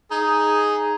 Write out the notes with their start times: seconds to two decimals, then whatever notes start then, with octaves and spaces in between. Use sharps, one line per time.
0.11 D#4 G#4